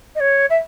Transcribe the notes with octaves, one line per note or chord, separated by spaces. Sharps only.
D#5
C#5
E5